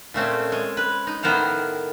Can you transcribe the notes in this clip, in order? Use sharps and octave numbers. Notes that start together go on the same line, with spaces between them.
A#2 A3 C4 C#4
G#3
B4
D#4
A2 D#3 B3 A#4 C5 F5